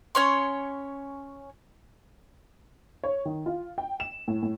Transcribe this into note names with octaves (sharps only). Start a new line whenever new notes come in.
C#4 C#5 C6
C#5
D#3
F4
G5
E7
A2
A2